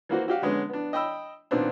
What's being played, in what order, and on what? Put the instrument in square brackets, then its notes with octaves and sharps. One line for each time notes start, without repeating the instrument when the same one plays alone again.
[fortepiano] E3 A#3 F#4 C5
F#4 G4 F5
D3 G#3 B3 C#4
B3 D4
D#5 G5 B5 E6
A#2 D#3 B3 C4 D4